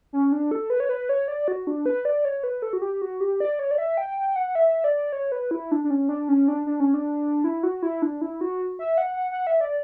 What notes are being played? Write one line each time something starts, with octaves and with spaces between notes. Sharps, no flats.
C#4
D4
A4
B4
C#5
B4
C#5
D5
F#4
D4
B4
D5
C#5
B4
A4
F#4
G4
F#4
G4
D5
C#5
D5
E5
G5
G5
F#5
E5
D5
C#5
B4
E4
D4
D4
C#4
D4
C#4
D4
D4
C#4
D4
E4
F#4
E4
D4
E4
F#4
E5
F#5
F#5
F#5
E5
D5